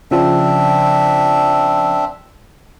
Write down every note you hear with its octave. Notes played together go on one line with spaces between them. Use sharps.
C#3 F3 C4 D4 E5